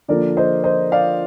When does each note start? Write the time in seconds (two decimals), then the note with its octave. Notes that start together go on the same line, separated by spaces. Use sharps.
0.08 D3 F3 A#3 A#4 D5
0.37 C5 D#5
0.64 C5 D#5
0.92 D5 F5